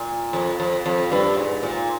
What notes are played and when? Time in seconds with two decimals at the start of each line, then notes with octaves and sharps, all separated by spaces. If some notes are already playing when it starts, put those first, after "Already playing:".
Already playing: A#2
0.33 F2
0.60 F2
0.86 F2
1.12 G2
1.37 G#2
1.63 A#2